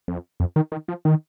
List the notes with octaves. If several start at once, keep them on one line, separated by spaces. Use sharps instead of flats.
F2
F2
D#3
D#3
F3
D#3